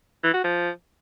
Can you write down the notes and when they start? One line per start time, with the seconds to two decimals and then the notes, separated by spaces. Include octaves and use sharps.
0.23 E3
0.34 F#4
0.44 F3